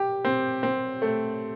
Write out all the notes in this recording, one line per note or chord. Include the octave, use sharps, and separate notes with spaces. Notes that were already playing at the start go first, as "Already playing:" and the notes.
Already playing: G4
C4
C4
A3